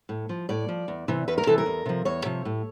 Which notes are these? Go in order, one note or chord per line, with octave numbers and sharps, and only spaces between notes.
A2
F3
A2 D5
F3
E2
C3 E3
E2 B4
A#4
C3 E3 A4
A#4
E2
C3 F3
E2 C#5
C3 F3
A2